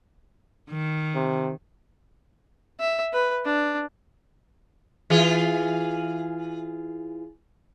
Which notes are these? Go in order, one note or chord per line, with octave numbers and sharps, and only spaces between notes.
D#3
C3
E5
B4
D4
E3 F4 G#4